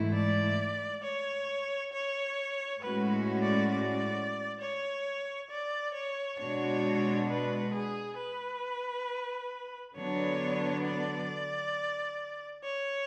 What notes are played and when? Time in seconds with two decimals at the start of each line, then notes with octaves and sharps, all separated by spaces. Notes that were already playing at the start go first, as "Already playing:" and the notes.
Already playing: G#2 E3 A3 E4
0.14 D5
1.03 C#5
1.93 C#5
2.82 A2 G#3 C#4 F#4 B4
3.42 D5
3.71 D5
4.60 C#5
5.51 D5
5.94 C#5
6.39 B2 G#3 D4 F#4 C#5
7.28 B4
7.74 G#4
8.18 B4
9.97 D3 F#3 B3 D4 C#5
10.85 D5
12.64 C#5